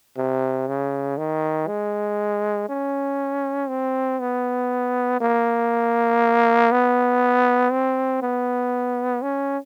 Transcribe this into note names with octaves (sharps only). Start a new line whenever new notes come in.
C3
C#3
D#3
G#3
C#4
C4
B3
A#3
B3
C4
B3
C#4